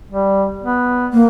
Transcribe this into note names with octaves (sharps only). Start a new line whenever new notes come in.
G3
B3
A#3